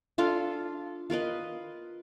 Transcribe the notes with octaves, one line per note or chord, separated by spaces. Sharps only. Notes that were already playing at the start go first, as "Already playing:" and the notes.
D4 F4 A4 F5
F4 A#4 B4 D#5